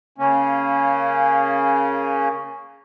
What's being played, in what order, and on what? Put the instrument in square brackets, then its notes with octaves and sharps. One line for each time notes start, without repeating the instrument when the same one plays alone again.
[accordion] C#3 A#3 C#4